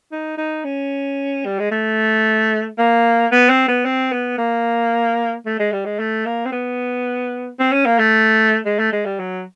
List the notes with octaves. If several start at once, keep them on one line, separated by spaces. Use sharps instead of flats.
D#4
D#4
C#4
G3
G#3
A3
A#3
B3
C4
B3
C4
B3
A#3
A3
G#3
G3
G#3
A3
A#3
C4
B3
C4
C#4
A#3
A3
G#3
A3
G#3
G3
F#3